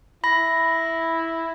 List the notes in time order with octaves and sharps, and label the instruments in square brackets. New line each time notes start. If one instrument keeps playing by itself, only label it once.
[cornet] E4 [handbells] B5 A#6